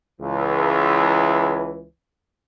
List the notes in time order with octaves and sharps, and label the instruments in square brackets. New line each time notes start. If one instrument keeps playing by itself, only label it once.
[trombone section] C#2 E3